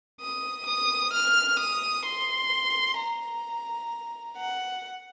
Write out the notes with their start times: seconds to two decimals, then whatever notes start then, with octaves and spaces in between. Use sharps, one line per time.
0.21 D#6
0.66 D#6
1.13 F6
1.60 D#6
2.05 C6
2.99 A#5
4.38 F#5